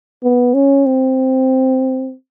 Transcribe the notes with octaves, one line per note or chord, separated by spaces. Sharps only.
B3
C#4
C4